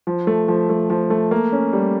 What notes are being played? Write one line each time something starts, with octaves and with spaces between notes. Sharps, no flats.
F3
A3
F3
A3
F3
A3
A#3
C#4
G3